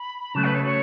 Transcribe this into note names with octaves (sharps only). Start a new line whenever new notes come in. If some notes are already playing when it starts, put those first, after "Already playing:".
Already playing: B5
C#3 F#3 A3 A5
B4
C#5
C#5